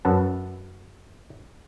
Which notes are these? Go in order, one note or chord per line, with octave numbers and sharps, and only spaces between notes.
F#2 B4 F#5 A5